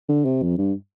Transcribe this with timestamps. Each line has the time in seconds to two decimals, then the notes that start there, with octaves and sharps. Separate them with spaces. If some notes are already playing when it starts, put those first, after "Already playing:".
0.09 D3
0.25 C3
0.42 F2
0.58 G2